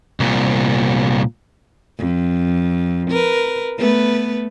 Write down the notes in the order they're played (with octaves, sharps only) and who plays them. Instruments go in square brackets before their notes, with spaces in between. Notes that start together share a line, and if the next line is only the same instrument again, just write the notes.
[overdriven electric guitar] C2 A#2
[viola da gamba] F2
A#4 B4
A3 B3 B4